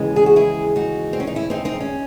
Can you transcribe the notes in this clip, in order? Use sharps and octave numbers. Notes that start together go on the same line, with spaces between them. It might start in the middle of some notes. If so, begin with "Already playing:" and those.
Already playing: D#2 C#3 E3 G#3
G#4
F#4
E4 G#4
D#4 F#4
C4
C#4
D#4
C#4 E4
C4 D#4
C4 D#4
C#4